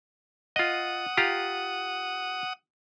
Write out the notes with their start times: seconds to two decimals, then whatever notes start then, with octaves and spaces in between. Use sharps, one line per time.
0.56 F4 D#5 F#5 D#6
1.17 F4 G4 A#5